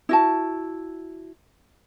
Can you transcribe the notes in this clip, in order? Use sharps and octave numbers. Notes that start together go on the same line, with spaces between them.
E4 F#4 A5